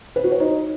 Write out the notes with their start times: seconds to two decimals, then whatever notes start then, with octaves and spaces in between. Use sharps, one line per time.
0.16 B4
0.24 F#4
0.32 C#5
0.40 D#4